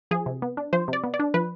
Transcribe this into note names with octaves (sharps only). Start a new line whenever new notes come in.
F3 G#4
C3
B3
D4
F3 C5
C3
D5
B3
D5
D4
F3 B4